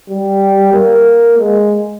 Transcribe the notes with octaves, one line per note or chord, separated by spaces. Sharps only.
G3
A#3
G#3